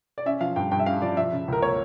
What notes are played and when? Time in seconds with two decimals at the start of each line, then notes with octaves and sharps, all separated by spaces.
0.18 D5
0.26 C#4 E5
0.41 F3 F5
0.56 G2 G5
0.71 G2 G5
0.79 E5
0.86 C#4 F5
1.02 F3 D5
1.17 F3 E5
1.32 C#3
1.48 C#2 A#4
1.62 A#3 C#5